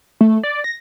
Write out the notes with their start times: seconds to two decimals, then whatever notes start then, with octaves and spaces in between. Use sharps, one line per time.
0.21 A3
0.43 D5
0.64 A#6